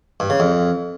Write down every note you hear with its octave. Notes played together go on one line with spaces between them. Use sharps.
G2
C#3
F2